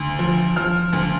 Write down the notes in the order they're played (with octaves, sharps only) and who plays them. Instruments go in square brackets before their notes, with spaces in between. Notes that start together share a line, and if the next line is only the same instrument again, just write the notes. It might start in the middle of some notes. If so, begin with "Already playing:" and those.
Already playing: [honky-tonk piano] D2
F3
F3 F6
D2